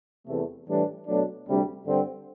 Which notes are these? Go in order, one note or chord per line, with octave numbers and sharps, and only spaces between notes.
E2 C3 E3 A3
A2 E3 G3 D4
B2 F#3 A3 D4
D2 C3 G3 D4
G2 D3 G3 C4